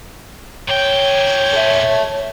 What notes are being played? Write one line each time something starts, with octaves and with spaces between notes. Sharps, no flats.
A#2 C#5 G5
A4 E5